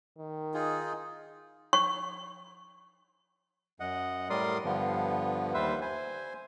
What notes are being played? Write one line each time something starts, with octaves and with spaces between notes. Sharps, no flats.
D#3
D#4 F4 G#4
C#6
F#2 D#5 F#5
A2 G3 A#4 D5 C6 D#6
G2 D3 F3 B3
D#2 G3 B4 C5 E5
C5 G#5